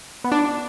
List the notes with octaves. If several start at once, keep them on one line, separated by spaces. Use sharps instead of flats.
B3
D4
D5